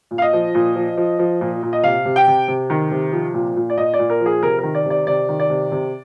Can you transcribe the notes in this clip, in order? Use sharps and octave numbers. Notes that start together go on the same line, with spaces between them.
A#2
F5
D#5
F3
A#2
F3
F3
F3
A#2
A#2
D#5
C3 F5
C3
G5
C3
C3
D#3
C3
F3
A#2
A#2
D5
A#2 D#5
D5
A#2
A#4
F3
G#4
C3 A#4
D#3 A#4
D5
C3
D5
C3 D5
D#3
D5
C3
C3